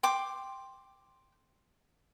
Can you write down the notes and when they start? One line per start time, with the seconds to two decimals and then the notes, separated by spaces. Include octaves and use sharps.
0.03 G5 C6 D6